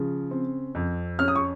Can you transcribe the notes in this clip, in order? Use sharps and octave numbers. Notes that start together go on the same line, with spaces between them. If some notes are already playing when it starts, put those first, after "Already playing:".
Already playing: C#3 F3
C4
F2
C#4 F6
D#6
C#6